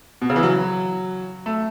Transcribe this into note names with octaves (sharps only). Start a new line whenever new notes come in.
B2
C#3
E3
F#3
A3